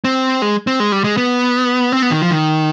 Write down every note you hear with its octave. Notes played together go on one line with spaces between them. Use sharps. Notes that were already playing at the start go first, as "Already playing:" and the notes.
C4
G#3
C4
G#3
G3
G#3
B3
C4
B3
D#3
F3
D#3